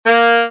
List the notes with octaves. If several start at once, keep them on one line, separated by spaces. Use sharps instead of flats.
A#3